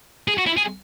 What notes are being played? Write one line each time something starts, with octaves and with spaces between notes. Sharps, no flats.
G#4
F#4
E4
G#4